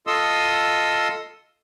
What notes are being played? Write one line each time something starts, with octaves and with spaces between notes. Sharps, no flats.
F4 A4 D#5 C6 D#6 E6